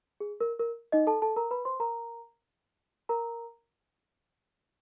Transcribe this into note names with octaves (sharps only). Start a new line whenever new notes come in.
G#4
A#4
A#4
D#4 D#5
A4 A5
A4 A5
A#4 A#5
B4 B5
C5 C6
A#4 A#5
A#4 A#5